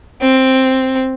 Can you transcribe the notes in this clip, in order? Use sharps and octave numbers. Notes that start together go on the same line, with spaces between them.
C4